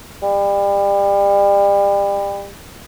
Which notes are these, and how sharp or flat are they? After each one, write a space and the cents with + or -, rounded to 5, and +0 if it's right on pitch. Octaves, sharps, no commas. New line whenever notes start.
G3 +30